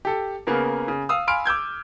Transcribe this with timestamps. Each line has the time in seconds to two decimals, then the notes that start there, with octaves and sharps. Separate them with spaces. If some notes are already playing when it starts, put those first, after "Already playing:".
0.05 G4 A4
0.47 C#3 A#3 B3 A#4
0.88 C#3
1.09 F5 D#6 E6
1.27 F5 G#5 B5 C6 F6 D7
1.46 D6 E6 G6 G#6